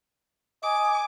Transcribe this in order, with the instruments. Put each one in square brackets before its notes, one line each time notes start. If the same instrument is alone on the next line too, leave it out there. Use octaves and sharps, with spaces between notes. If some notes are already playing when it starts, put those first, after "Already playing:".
[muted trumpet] D#5 [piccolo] G#5 [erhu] D6